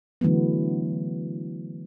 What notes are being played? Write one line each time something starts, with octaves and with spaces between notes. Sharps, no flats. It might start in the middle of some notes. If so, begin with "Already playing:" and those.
D3 E3 F#3 A3 B3